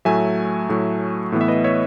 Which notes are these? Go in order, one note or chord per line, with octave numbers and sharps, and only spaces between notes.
A2 F#3 A3 E5 G#5
A2 F#3 A3
A2 E3 B3
E5
B4 D#5
C#5 E5